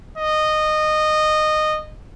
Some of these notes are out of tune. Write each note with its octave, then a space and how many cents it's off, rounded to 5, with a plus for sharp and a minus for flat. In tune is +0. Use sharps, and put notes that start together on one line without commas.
D#5 -15